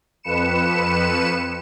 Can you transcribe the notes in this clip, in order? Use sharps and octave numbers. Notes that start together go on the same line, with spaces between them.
F2 B4 C#7 E7